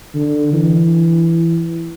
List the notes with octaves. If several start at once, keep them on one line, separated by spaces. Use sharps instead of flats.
D3
E3